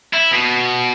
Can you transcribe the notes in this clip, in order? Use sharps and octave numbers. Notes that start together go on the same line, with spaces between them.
E4
B2